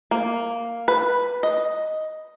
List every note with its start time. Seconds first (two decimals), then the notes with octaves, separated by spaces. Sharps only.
0.11 A#3
0.88 B4
1.43 D#5